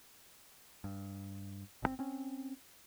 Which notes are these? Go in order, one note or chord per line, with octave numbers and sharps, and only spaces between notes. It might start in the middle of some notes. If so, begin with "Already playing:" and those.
G2
G#1 C3 C4
C4 C#4